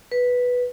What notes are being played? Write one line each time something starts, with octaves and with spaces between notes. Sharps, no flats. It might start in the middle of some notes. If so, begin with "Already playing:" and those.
B4